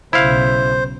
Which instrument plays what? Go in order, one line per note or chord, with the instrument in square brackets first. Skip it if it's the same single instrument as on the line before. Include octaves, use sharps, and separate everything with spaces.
[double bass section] B1 C#3 [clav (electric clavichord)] E4 F5 [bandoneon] C5